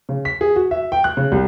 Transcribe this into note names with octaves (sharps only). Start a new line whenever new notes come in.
C#3
B6
G#4
F#4
E5
G5
F#6
C#3
C2